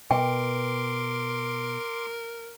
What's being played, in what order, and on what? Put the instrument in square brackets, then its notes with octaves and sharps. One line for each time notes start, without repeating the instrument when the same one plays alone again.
[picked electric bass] B2 [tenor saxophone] A#4 [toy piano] G5 [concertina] C6 D6